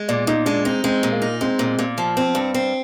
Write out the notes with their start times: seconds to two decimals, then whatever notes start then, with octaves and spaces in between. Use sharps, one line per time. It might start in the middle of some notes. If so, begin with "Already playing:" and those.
Already playing: G#3
0.08 A#2 D5
0.27 A#2 D#4
0.46 G#3 D4
0.65 C4 D#4
0.84 G#3 C4
1.03 A#2
1.12 A#3
1.22 D#4
1.41 G#3 C4
1.59 A#2
1.79 A#2
1.98 F3
2.17 C4
2.35 G2
2.54 C4